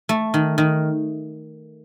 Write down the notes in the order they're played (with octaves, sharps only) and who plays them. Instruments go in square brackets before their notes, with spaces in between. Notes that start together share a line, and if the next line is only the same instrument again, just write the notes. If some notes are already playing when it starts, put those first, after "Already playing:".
[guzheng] A3
D#3
D#3